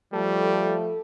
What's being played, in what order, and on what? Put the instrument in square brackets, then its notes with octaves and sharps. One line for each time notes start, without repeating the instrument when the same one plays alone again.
[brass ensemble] F3 A3 [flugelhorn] G3 [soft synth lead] A4